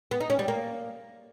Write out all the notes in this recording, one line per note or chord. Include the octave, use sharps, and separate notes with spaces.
B3
D#4
C#4
G3
A#3